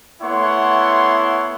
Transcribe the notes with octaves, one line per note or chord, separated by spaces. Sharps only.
A3 B3 E4 C#5 F#5 C6